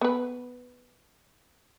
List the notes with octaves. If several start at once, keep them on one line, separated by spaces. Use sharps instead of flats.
B3 B4